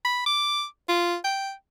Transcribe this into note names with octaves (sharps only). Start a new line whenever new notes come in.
B5
D6
F4
G5